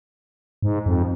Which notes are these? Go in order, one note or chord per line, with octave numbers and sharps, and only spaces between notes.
G#2
F2